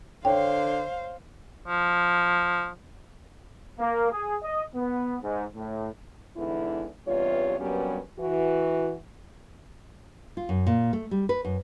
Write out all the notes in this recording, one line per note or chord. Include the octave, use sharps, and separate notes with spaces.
D3 C5 C#5 F5 G5
F3
A#3
G#4
D#5
B3
G#2
A2
E2 G#2 D3 E3 E4
E2 G2 C3 F4 C#5
G2 F#3 G3 A#3 B3 C#4
E3 F#4
F4
F#2
A#2
A3
G3
B4
F#2